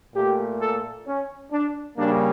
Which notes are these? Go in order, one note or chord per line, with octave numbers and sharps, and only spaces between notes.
A#2 A3 G4
A4
C#4
D4
C#3 G3 A#3 D4